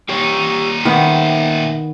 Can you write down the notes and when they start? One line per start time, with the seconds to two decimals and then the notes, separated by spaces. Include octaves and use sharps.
0.09 A#2 D#4 G4 C#5
0.85 D#3 B3 E5 G5